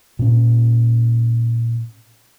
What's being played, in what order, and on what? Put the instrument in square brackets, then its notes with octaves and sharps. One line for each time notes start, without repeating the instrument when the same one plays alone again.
[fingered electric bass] A#2 C#4